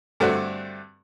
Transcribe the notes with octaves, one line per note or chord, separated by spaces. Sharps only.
G2 D3 A3 C4 D4 F#4